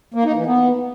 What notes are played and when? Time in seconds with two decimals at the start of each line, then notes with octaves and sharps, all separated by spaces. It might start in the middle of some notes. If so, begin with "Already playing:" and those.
0.14 A#3
0.25 D#4
0.36 E3
0.46 B3